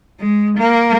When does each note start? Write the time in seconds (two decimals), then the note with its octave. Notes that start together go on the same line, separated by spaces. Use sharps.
0.20 G#3
0.58 A#3